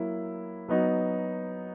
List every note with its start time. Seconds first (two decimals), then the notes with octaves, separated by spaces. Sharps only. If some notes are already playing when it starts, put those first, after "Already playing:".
Already playing: F#3 A#3 E4
0.68 F#3 B3 D#4 F#4